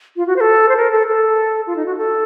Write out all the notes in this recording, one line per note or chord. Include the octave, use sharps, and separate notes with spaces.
F4
F#4
C5
A4
C5
A#4
A4
A4
F4
D#4
F#4
A4